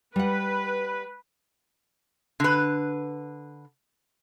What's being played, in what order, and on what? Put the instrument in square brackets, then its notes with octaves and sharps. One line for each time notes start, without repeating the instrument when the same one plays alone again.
[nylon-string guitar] G3 F#5 [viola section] B4
[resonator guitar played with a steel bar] D3 B4